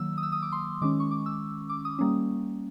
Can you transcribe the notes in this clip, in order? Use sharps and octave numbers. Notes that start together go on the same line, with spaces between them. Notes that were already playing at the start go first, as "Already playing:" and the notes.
Already playing: D#3 F#3 A#3 E6
D#6
E6
D#6
D6
C6
D#3 G#3 C#4 D6
C#6
D6
E6
D6
D#6
G3 A#3 C#4